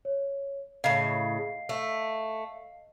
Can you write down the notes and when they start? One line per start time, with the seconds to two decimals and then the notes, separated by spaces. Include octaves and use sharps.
0.05 C#5
0.84 A2 C#3 D#5 F5 C7
1.69 A3